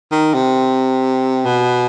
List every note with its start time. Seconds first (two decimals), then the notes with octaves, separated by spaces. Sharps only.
0.12 D#3
0.34 C3
1.46 B2